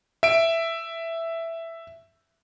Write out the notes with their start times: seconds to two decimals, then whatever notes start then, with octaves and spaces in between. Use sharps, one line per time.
0.23 E5 D7